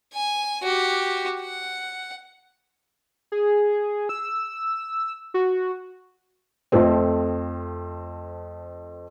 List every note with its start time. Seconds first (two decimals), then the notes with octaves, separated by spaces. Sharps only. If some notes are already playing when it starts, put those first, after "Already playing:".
0.13 G#5
0.63 F#4 G4
1.41 F#5
3.32 G#4
4.09 E6
5.34 F#4
6.72 F2 F3 A3 C4